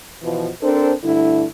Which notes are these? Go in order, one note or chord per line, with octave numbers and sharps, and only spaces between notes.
B2 E3 F3
C4 D4 A4 A#4 C5
G2 D3 A3 E4